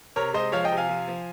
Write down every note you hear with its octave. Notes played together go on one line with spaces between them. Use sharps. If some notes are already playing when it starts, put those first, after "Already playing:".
C3 A#4 C#5
G#3 C5 D#5
F3 C#5 F5
D#5 G5
C3
F5 G#5
F3
F3